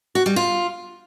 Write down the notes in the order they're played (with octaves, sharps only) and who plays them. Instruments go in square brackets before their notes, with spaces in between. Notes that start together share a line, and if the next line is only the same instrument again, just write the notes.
[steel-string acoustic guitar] F#4
G3
F4